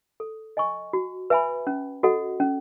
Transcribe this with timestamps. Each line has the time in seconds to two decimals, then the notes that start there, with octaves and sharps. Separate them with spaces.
0.20 A4
0.57 D#5 G#5 C#6
0.93 F#4
1.30 B4 E5 G#5 B5
1.67 C#4
2.03 F#4 A4 D#5 F#5
2.40 C#4